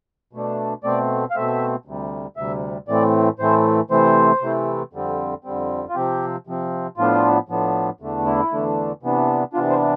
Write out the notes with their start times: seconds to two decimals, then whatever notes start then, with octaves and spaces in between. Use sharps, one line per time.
0.33 B2 A3 D4
0.84 B2 A3 C4 D5
1.31 F5
1.35 B2 A3 C4 E5
1.85 D2 C3 G3
2.37 D2 C3 G3 E5
2.88 A2 E3 A3 C4 D5
3.39 A2 E3 A3 C4 C5
3.90 C3 E3 A3 C4 C5
4.42 C3 E3 A3 C4
4.93 F2 D3 G3 C4
5.44 F2 D3 G3 C4
5.89 F4
5.95 C3 F3 C4 G4
6.47 C3 F3 C4
6.97 A2 F3 B3 D4 F4
7.49 A2 F3 B3 D4
8.00 E2 D3 A3 D4
8.26 E4
8.51 E2 D3 A3 D4
9.03 C3 E3 B3 D4
9.53 C3 E3 B3 D4 F4
9.70 C5